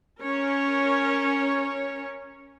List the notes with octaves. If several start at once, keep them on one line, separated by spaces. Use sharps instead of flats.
C#4 A#4 C#5